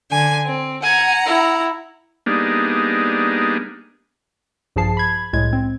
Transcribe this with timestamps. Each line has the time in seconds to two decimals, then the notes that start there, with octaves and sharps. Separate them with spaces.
0.11 D3 G#5
0.45 C4
0.83 F#5 G#5 A#5
1.26 E4
2.26 G3 A#3 B3 D4 D#4 G#4
4.76 A#1 G2 F3 G#4 A5 C7
4.97 B5 G#6
5.33 C2 A2 G#3 G#6
5.53 C4